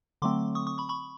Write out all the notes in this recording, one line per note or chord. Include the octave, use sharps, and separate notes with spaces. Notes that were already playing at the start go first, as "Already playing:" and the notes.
D3 F#3 A3 C4 C6 D6
C#6 D#6
C#6 D#6
B5 C#6
B5 C#6